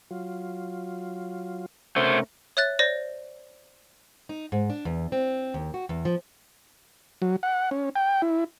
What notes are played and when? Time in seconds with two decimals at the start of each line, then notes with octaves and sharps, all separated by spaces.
0.11 F#3 F4
1.96 C3 A3 C#4 A#4 C5
2.57 C#5 E5 F#6 A6
2.79 C5 D5 A#6
4.29 D#4
4.52 G#2
4.70 D4
4.85 E2
5.12 C4
5.54 D#2
5.74 F#4
5.89 E2
6.05 F3
7.22 F#3
7.43 F#5
7.71 C#4
7.96 G5
8.22 E4